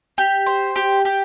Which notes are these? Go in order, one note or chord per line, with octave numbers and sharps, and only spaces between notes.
G4
C5
G4
G4